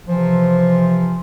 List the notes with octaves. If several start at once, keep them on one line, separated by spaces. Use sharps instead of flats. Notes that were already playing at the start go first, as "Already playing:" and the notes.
C3 E3 F3